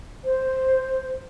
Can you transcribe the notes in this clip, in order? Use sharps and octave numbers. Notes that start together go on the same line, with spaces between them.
C5